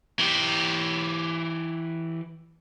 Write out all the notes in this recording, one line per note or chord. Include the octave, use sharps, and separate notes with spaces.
E3 G4